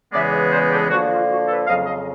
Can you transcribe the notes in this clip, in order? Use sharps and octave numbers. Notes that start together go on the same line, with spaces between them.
E2 C#3 E3 G#3 B3 D5 E5
C5 D5
G4 A4
D3 F3 A#3 F#4
F4
F#4
A4 B4
F2 C#3 F#3 D#5 F5
D#5 F5